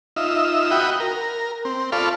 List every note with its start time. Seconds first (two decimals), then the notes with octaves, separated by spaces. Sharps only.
0.16 D#4 F4 E5
0.71 F#4 G5 B5 D#6
1.00 A#4
1.65 C4
1.92 F4 A4 D5 F5 B5 C#6